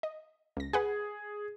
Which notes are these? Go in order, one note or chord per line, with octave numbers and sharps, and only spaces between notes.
D#5
C#2 A#6
G#4 B4 F#5 G#5